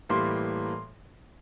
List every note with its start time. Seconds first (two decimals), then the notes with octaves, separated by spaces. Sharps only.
0.09 A2 E3 G3 A#3 C6